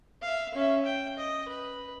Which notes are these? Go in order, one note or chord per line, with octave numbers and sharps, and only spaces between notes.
E5 F5
C#4 E5
G5
D#5
B4